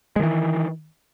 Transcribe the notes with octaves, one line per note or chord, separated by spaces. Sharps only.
D#3 E3 G#3